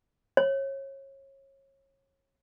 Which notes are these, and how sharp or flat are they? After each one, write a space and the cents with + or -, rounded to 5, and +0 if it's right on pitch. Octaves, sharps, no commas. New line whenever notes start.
C#5 -25